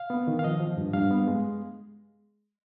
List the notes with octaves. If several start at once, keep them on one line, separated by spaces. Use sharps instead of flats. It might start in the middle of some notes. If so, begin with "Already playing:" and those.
Already playing: F5
B3
D#3
F5
F3 D#5
F3
G2
G2 F5
B3
G#3